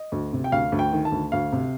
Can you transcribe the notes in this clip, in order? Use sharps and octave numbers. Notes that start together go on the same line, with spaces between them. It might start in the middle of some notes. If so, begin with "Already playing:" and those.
Already playing: D#5
D2
C3
G5
D2 F5
D2
G5
D#3
A5
D2
D2 F5
C3